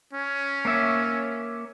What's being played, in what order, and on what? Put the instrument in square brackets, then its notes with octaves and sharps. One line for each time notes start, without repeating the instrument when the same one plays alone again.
[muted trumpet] C#4
[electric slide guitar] A#3 C#5 E5